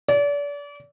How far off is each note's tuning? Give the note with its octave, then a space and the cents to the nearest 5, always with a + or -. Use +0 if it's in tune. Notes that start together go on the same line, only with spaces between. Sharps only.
D5 -35